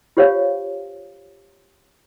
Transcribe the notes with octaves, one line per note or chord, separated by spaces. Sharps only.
F4 G4 C5 C#5 F5